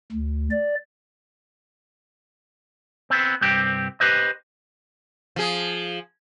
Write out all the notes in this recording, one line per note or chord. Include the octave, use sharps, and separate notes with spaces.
D2
D5
B3 C4
C2 G2 C4 G4
G4 B4 C5 D#5
F3 G#4